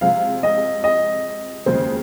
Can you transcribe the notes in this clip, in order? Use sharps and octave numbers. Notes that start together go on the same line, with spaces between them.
C3 F3 G#3 F5
D#5
D#5
F1 D#2 C#3 F3 G#3 C5